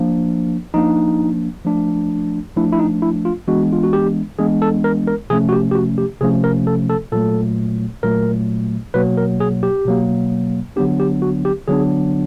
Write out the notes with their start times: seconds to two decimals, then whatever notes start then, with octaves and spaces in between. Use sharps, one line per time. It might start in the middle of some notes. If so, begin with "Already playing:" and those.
Already playing: F3 A#3 D4
0.74 F3 A#3 D4 D#4
1.65 F3 A3 D4
2.57 F3 A3 D4 E4
2.73 E4
2.79 D#4
3.02 E4
3.25 F4
3.48 E3 G#3 B3 D4 F#4
3.73 F4
3.83 F#4
3.93 G4
4.39 E3 G#3 B3 D4 G#4
4.62 A4
4.84 A#4
5.07 A#4
5.30 C3 F3 A3 C#4 G#4
5.49 F#4
5.53 G4
5.71 G4
5.75 F#4
5.98 G4
6.21 C3 F3 A3 C#4 G#4
6.44 A#4
6.67 A4
6.89 A4
7.12 A#2 F#3 A3 A4
8.03 A#2 F#3 A3 A#4
8.94 B2 F#3 A#3 B4
9.18 A#4
9.40 G#4
9.63 G4
9.86 B2 F#3 A#3
10.76 D3 F#3 B3 D4 G4
11.00 G4
11.22 F#4
11.45 G4
11.68 D3 F#3 B3 D4 G#4